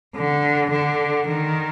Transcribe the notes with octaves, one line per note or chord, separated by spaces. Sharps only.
D3
D3
D#3